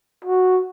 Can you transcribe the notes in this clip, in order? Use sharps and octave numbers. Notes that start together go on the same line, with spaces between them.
F#4